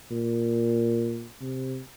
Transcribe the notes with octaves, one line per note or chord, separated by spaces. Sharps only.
A#2
C3